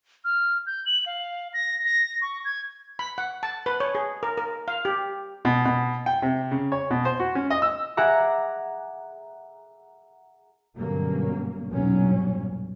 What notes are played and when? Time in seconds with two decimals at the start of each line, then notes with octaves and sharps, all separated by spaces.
0.25 F6
0.66 G6
0.86 F#7
1.06 F5
1.54 A#6
1.85 A#6
2.22 C#6
2.45 G#6
2.99 B5
3.18 F#5
3.43 A5
3.66 B4
3.80 C#5
3.95 G#4
4.23 A#4
4.38 A#4
4.68 F5
4.85 G4
5.45 B2
5.65 B2
6.06 G5
6.22 C3
6.51 C#3
6.72 C#5
6.90 B2
7.05 C5
7.20 F#4
7.35 C#4
7.50 D#5
7.62 E6
7.97 G#4 E5 F#5 A#5 D6
10.76 G2 B2 D3 F#3 A#3 C#4
11.71 B1 E2 G2 A#2 F#3 C#4